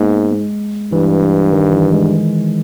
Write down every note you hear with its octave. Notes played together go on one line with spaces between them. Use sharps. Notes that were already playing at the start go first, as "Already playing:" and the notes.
Already playing: G#2 A#3 B3
G#3
G2 E3
D#3
E3
G#3